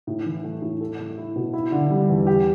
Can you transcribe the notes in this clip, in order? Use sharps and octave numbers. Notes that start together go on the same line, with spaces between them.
A2
E3
A3
A2
A4
A3
E4
B2
E4
D3
G3
E2
G4